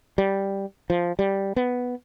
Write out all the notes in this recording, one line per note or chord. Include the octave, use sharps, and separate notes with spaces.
G3
F3
G3
B3